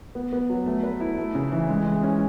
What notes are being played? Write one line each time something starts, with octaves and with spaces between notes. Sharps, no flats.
B3
B3
F#3
A3
B4
E4
A3
C#3
E3
G#3
G#3
C#4